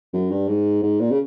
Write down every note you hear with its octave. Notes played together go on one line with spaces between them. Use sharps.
F#2
G2
G#2
G#2
A#2
C#3